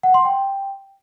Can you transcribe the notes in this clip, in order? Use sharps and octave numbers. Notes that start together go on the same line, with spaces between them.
F#5
C6
G5